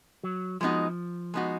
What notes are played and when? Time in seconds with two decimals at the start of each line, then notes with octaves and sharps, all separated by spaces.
0.23 F#3
0.61 F3 G#3 B3 D#4 F#4
1.34 G#3 B3 D#4 F#4